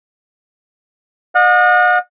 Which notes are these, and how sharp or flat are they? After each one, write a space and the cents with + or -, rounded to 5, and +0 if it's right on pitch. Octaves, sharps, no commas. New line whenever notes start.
D#5 -40 F#5 -40